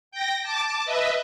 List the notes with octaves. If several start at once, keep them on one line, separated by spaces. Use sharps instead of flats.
G5 A#6
A5 D6
B4 D#5 E5